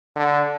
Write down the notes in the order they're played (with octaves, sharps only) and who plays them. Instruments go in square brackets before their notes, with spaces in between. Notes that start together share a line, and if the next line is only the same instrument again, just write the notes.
[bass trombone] D3